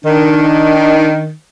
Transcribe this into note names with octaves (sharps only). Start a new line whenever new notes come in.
D#3 D4